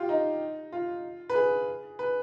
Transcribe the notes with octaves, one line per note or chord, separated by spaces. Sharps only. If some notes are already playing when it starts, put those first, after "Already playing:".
Already playing: F4 G4
D#4
F4
B4
G#4
B4